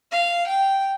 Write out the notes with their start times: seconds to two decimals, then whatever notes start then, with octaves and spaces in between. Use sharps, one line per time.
0.11 F5
0.48 G5